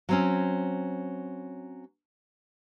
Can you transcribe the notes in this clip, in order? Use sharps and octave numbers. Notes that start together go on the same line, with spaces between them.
F#3 C4 C#4